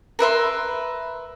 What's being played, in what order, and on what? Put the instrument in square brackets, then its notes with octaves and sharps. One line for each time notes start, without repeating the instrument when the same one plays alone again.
[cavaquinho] A#4 B4 E5 C6